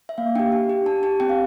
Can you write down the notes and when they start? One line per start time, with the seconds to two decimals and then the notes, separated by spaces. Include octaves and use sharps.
0.09 E5
0.18 A#3 F5
0.35 D4 G4 G5
0.52 D4
0.70 G4
0.86 D4 A5
1.03 G4 A5
1.20 C4 G5
1.29 F5